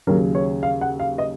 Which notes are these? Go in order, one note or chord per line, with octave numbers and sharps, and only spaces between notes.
D#2 C#3 F#3 A#4
C#5
F5
F#5
F5
D#5